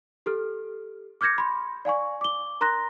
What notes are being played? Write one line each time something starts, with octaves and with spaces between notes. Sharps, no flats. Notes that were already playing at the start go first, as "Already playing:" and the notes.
G4 A4 F6
D6 F6 G6 G#6 A#6 C#7
B5 C6
D5 F5 G#5 C#6
D6 G7
A#4 A#5 C6 F#6 A#6